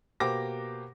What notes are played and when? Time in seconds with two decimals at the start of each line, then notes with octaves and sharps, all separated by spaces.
0.20 B2 A#3 G4 C5 D6 A#6